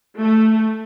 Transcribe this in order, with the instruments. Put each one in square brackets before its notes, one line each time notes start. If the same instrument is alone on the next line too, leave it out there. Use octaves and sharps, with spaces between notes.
[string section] A3